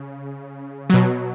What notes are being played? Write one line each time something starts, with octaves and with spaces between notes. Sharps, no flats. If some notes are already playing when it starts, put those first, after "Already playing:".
Already playing: C#3
B2 F#3